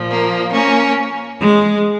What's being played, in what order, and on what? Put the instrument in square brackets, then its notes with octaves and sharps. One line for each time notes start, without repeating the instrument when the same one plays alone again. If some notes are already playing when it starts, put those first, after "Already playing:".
Already playing: [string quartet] A#2 F3
A#3
A#3 C#4
G#3